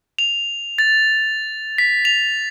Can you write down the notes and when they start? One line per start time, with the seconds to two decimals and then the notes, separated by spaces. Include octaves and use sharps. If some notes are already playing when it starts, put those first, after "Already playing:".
0.19 F7
0.78 A6
1.78 B6
2.05 F7